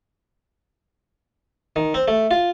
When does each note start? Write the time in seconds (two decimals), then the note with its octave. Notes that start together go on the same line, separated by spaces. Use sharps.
1.76 D#3
1.94 C4
2.08 A3
2.31 F4